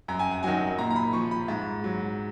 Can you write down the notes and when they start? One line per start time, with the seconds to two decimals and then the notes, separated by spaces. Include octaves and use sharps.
0.08 F#2 A#5
0.19 G#5
0.31 F#5
0.43 D#3 F#3 G#5
0.78 A#2 A#5
0.90 A#5
0.96 B5
1.13 F3 C#6
1.31 B5
1.48 G#2
1.84 F#3